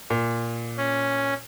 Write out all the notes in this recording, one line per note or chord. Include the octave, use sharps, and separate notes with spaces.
A#2
C#4